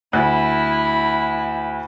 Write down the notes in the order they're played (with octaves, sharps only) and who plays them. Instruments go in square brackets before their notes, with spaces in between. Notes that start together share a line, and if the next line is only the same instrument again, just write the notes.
[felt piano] D2 [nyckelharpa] E4